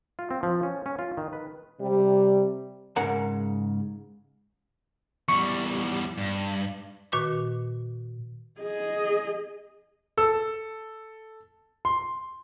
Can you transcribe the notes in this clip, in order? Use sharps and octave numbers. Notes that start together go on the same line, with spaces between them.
F4
C4
F3
C#4
C#4
F4
D#3
B4
C3 G3
G#2 C#3 A#4 F#5 A#5
E2 G3 C#6
G2
A#2 D#3 F#4 B4 C#6 D6
G#4 D#5
A4 E6
C6